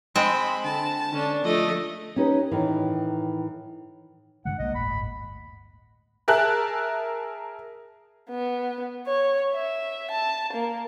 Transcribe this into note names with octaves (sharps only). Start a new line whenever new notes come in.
G#3 C4 B5
D3 A5
D3 C#4 D4
F3 A3 D#5
C#4 D#4 G4 B4
A2 D#3 E3
G2 D3 G#3 F#5
B1 G#3 A#3 D#5
G1 D2 A2 B5
G#4 A#4 E5 A5 F#6
B3
C#5
E5
A5
A#3